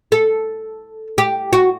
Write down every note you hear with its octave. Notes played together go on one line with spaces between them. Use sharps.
A4
G4
F#4